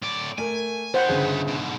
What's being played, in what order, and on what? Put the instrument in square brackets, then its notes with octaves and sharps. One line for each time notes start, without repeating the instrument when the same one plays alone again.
[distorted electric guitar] A2 D5
[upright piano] A3 A#4 [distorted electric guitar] G#5
[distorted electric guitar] B3 D#4 [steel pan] C5 F#5
[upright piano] G1 C#3 G#4
[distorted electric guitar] G#2 B2